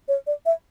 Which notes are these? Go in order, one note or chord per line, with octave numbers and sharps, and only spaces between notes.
C#5
D5
E5